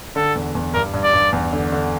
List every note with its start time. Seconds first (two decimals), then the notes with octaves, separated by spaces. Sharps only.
0.16 D3 A4
0.35 E2
0.55 E2
0.74 G2 A#4
0.94 G2
1.04 D5
1.13 G2
1.33 E2
1.53 D3
1.72 D3